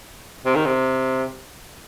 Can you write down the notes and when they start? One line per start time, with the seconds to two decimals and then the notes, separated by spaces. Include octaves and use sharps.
0.45 C3
0.55 D#3
0.66 C3